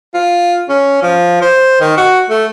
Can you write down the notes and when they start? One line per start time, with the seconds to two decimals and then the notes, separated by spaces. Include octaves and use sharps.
0.14 F4
0.69 C#4
1.02 F3
1.42 C5
1.81 D#3
1.97 F#4
2.30 A3